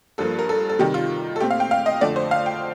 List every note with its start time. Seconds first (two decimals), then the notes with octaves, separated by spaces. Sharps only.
0.18 G2 F3 A#3 A4
0.39 A#4
0.49 A4
0.69 A4
0.79 C3 D#3 G3 G4
0.94 F4
1.36 A4
1.40 A#2 A3 C4 G4
1.50 F5
1.60 G5
1.71 F5
1.86 D#5
2.01 F2 D3 A3 D5
2.16 C5
2.31 F5
2.46 G5